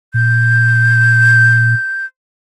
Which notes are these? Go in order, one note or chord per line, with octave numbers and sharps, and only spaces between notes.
A#2 G6